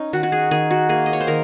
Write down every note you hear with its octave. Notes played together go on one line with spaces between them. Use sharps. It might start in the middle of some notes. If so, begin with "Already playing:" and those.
Already playing: C#4 D#4
D#3 F#4
F#4
G#4
D#3 G#4
F#4
A#3 G#4
D#5
C#5
C5
D#3 A#4